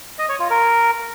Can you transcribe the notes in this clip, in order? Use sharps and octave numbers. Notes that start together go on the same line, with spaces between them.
D#5
C#5
F4
A#4